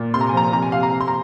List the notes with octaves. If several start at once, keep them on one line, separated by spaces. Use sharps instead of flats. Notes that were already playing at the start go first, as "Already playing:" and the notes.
Already playing: A#2
C3 C6
A#5
G#5
F3 A#5
C3 A#5
G#5
C3 F5
A#5
C3
C6
A#5